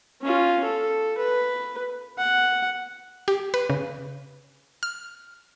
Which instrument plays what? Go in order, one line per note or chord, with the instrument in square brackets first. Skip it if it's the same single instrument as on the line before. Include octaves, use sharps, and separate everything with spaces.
[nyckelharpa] C#4 F4
A4
B4
F#5
[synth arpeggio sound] G4
B4
C#3
F6